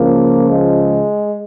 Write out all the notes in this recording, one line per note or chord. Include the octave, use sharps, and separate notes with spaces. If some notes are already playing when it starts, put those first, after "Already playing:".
Already playing: C#2 C#3 F3 A#3
G#3